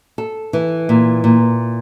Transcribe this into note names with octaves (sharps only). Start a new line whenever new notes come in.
A4
E3
A#2
A#2